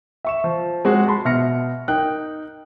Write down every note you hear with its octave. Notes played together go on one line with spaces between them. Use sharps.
E5 C#6 E7
F3
G#3 C4 F#4
A5 B5 C6
B2 E5 F6 A#6 C#7
D#4 A#4 G5 F#6